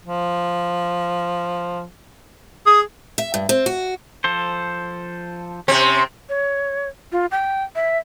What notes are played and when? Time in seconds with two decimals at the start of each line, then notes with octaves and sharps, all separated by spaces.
0.05 F3
2.66 G#4 D#6
3.18 E5
3.34 G2
3.49 C4
3.66 F#4
4.24 F3 A4 C5
5.68 C3 C4 C#4
6.29 C#5
7.12 F4
7.31 G5
7.75 E5